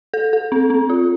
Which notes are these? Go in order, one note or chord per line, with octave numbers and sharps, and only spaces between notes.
A4
A4
C4
C4
F4